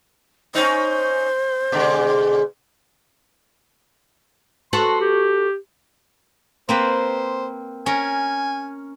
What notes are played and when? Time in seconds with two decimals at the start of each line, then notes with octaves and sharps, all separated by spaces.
0.55 C#4 D#4 C5
1.72 B2 D3 G#3
4.73 F#4 A4 B4 C6
5.00 G4
6.69 A#3 C4 B4 C5
7.86 C#4 A#4 G#5